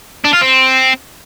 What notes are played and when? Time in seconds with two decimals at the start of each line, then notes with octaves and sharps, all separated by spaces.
0.25 D4
0.33 F4
0.42 C4